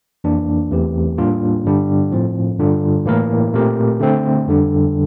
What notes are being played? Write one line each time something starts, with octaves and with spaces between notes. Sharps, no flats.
F2 E3 A#3 D4
E2 E3 A3 C4 G4
A2 G3 A#3 D4 F4
G2 D3 G3 D4
A2 F3 C4
G2 D3 G3 D4 F4
A2 E3 A#3 E4 A#4
A#2 A3 C4 G4 A#4
D3 A3 C4
F2 D3 G3 D4